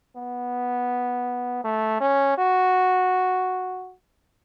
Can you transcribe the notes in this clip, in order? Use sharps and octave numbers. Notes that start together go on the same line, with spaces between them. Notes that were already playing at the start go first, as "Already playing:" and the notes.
B3
A3
C#4
F#4